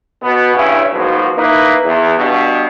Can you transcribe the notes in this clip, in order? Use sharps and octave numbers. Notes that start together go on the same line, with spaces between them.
B2 B3
G2 C#3 C#4 E4
G#2 B2 F3 F#3 A#3
A#3 D#4 E4 B4
E2
G2 B2